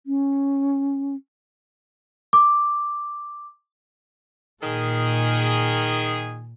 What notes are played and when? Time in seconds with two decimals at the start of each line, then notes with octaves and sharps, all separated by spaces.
0.06 C#4
2.33 D6
4.63 A#2 D#3 G#4